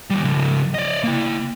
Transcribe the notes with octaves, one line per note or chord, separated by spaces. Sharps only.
D#3 G3
C#3 F3
D5 D#5
A#3 E4